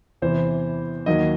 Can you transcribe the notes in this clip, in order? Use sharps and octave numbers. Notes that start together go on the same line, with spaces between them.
E2 C3 E3 C5
D#2 D#3 F#3 D#5